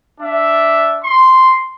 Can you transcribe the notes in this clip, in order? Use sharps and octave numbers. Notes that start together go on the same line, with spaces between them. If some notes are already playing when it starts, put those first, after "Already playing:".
D4 E5
C6